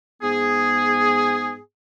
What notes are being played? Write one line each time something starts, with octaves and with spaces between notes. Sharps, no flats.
G#2 B3 G#4